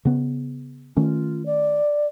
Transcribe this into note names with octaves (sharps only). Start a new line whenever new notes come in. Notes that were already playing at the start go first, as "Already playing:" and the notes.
C#3 B3
D#3 A3 C#4 F4
D5